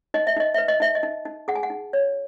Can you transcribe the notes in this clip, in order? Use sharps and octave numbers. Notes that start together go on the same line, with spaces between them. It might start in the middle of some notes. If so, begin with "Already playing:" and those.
D#4 D#5
E5
D#4 D#5
B4 E5
D#5
D#4 E5
D#5
D#4
D#4
G#4 F#5
G#5
F#5
D#4
C#5